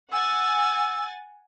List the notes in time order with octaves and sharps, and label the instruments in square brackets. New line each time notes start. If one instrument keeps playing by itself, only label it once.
[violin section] F#5 G#5 A6 [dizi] E6